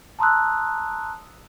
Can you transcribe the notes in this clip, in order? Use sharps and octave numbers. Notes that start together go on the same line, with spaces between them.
A5 A#5 C6 D#6 E6 F#6